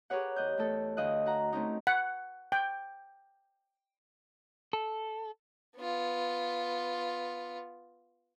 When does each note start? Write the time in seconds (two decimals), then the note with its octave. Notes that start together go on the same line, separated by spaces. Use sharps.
0.10 G4 G#4 A#4 B4 C#5 F#5
0.36 E2 D#5 F#6 G6
0.57 E2 A3 A4
0.97 D2 D#5 F5 G5 F#6
1.26 F#4 F#5 A#5
1.53 A3 C4 C#4 D#4
1.87 F#5
2.52 G5
4.73 A4
5.76 B3 F4